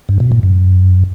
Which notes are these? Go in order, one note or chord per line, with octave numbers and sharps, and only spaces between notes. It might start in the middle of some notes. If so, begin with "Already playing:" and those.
G2
B2
A#2
F#2